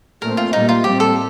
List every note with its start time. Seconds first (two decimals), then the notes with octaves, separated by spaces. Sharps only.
0.22 A#2 A3 C4 A#4
0.37 F4
0.53 A#2 G3 A#3 D#4
0.69 F4
0.84 A2 G3 C4 G4
1.00 A4